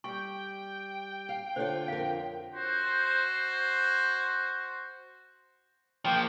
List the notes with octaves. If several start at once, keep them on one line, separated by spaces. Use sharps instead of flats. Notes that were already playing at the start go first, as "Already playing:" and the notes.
G3 G5 C#6
F5
D3 F4 C5 C#5
F2 A#4 F5
F#4 C5
F3 A#3 G5